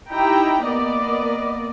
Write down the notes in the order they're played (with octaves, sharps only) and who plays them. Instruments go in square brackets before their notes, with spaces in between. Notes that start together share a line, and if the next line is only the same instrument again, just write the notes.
[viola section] D#4 E4 G4 G5 A#5
A#3 B3 D5 D#5